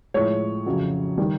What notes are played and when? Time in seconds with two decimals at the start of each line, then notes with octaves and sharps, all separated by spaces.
0.14 A2 F3 G#3 C#5
0.67 F2 C#3 F#3
1.18 D#3 G3